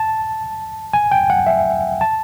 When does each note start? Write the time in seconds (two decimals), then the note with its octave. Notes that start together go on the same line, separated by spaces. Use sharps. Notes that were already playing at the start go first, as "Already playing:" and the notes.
Already playing: A5
0.93 G#5
1.12 G5
1.30 F#5
1.47 E5
2.01 A5